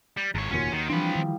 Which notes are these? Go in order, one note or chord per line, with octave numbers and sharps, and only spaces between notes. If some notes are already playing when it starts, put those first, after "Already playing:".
G3
G#1 E2 C#5
F1 D#2 A#2 C#4 F#4 C#5 C6
D#2 D#3
E3 F3 G3 C4 D4 B5
D#3